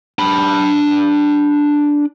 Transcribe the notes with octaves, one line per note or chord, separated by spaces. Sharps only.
D4 B5